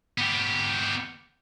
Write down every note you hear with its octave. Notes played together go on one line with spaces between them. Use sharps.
B3 G4